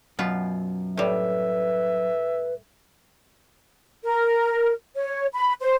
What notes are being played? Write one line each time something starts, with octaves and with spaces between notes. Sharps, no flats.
F#2 B2 B3 F4
A2 G3 B4 E5
A#4
C#5
B5
C5